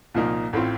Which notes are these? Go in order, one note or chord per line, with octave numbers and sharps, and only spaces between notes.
C2 A#2 F3 A#3 D#4
A1 A2 A3 C4 F4